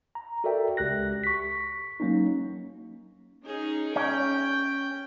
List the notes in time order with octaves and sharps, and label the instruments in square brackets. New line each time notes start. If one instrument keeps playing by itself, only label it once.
[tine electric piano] A#5
F#4 A4 A#4 D5 E5 G5
C#2 G4 F#6 A#6
C#6 B6
F#3 A#3 C#4 D#4
[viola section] C#4 D#4 G#4
[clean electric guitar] C#4 [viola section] G5